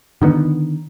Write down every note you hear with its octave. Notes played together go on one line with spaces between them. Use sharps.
D3 D#3 G#3 B3